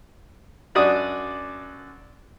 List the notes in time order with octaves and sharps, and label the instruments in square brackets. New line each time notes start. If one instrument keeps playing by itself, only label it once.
[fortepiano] F#2 D4 F#4 D5 D#6